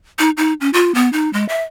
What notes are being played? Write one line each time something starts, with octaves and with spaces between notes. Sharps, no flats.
D#4
D#4
C#4
F4
B3
D#4
G#3
E5